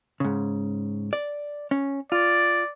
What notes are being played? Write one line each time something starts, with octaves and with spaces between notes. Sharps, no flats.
G#2 C#3
D5
C#4
F4 D5